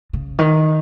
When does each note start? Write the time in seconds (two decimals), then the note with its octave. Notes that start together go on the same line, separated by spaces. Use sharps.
0.13 C#3
0.39 D#3